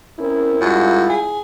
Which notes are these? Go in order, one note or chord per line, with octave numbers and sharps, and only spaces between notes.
C4 C#4 E4 A#4
F#2 G3 G#3 F4
G#4